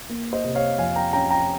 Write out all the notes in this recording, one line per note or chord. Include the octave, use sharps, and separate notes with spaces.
A#3
C5 D#5
C3
C#5 F5
F2 F5 G#5
G5 A#5
C#4 G5 A#5
G5 A#5